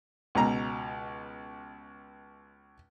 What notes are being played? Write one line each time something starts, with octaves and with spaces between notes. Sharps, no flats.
C#2 B2 A#5